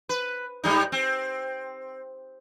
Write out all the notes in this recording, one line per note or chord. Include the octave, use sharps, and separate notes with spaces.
B4
G#2 G3 D#4
C4